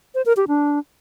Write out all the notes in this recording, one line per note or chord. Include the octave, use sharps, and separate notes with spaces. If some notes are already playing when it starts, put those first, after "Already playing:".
C5
A#4
G4
D4